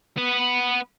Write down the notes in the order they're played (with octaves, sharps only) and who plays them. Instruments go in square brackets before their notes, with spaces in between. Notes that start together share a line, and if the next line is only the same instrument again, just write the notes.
[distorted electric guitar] B3 B4